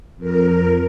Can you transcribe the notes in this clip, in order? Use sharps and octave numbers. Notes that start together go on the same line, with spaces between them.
F2 A#4